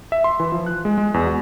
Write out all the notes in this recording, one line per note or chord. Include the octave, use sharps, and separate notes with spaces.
E5
C6
E3
F3
F#6
G#3
G#3
E2
F#4